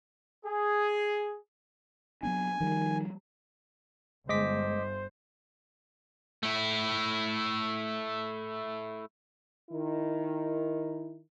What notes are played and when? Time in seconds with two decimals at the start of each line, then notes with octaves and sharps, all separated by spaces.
0.45 G#4
2.23 F#3 B3 D4 G#5
2.61 D#3 F3 G3
4.29 G1 G#3 C5 D#5 D6 B6
6.43 A3 E4
9.70 D#3 E4